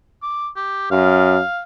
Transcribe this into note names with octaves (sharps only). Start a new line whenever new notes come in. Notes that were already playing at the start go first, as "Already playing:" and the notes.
D6
G4
F#2 F5